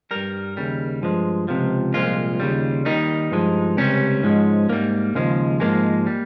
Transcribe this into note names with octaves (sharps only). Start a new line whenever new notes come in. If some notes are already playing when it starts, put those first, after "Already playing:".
G2 G3 A#4
D#2 C#3 G3
G2 F3 G#3
C#2 C3 F3
C2 A#2 F3 G#3 F4
D#2 C#3 G3
D#2 D#3 G3 D#4
G2 F3 G#3
C#2 C3 G3 C#4
G#2 F3 G#3
G#2 G3 A#3
D#2 C#3 F3 G#3
G#2 F3 G#3 A#3
G3